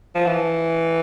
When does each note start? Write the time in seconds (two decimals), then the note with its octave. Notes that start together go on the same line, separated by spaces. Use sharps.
0.15 F3
0.27 E3